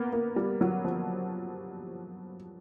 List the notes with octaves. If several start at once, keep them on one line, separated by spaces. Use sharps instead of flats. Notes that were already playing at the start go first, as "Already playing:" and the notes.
Already playing: A#3 B3
A#3
G3
F#3
F3